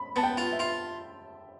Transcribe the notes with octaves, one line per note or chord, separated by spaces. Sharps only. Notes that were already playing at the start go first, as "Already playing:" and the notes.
Already playing: B5
B3 A5
G5
F4
E5
F4